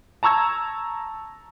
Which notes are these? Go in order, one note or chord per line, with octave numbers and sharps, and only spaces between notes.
A5 A#5 C#6 E6 G#6